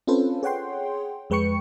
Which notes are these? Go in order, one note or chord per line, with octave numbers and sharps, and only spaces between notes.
C4 C#4 F4 A4 B4 C5
G#4 C#5 F#5 G5 C6
F2 G#3 B4 G5 C#6 C#7